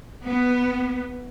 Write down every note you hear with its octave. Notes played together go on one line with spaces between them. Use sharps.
B3